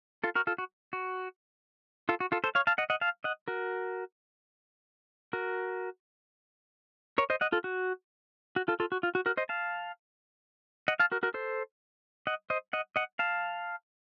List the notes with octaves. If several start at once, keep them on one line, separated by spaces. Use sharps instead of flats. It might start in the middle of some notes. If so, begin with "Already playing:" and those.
F4 A4
F#4 A#4
F4 A4
F#4
F#4
F4 A4
F#4
F4 A4
A4 C5
C#5 F5
F5 A5
D#5 F#5
D#5 F#5
F5 A5
D#5 F#5
F#4 A#4
F#4 A#4
A#4 C#5
C5 D#5
D#5 F#5
F4 A4
F#4
F#4
F4 A4
F4 A4
F#4
F4
F#4
F#4 A#4
C5 D#5
F5 A5
D#5 F#5
F5 A5
F#4 A#4
F#4 A#4
A4 C5
D#5 F#5
C5 D#5
D#5 F#5
D#5 F#5
F5 A5